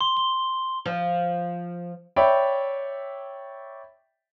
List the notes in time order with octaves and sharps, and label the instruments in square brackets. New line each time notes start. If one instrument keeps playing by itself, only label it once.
[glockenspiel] C6
G7
[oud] F3
[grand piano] C#5 D5 E5 G5 B5